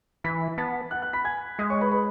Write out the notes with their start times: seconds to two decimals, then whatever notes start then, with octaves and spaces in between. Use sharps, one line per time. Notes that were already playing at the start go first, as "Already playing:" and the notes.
0.24 E3 B5 B6
0.58 B3 A5 A6
0.91 F#5 F#6
1.02 F#5 F#6
1.13 B5 B6
1.24 G#5 G#6
1.59 G#3 D#5 D#6
1.70 C#5 C#6
1.81 B4 B5
1.92 B4 B5